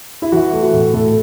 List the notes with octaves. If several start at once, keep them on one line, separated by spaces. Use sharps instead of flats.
E4
E3 F#4
A3
F#4
A2
A2 A4